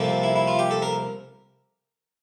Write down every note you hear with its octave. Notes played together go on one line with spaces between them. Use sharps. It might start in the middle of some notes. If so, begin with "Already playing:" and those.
Already playing: C2 C3 F3 A#3 A4
E4
E4
F4
G4
A4
A#4